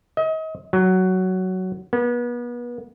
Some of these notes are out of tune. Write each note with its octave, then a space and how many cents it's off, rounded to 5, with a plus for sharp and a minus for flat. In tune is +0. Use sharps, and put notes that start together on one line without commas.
D#5 +35
F#3 +10
B3 -35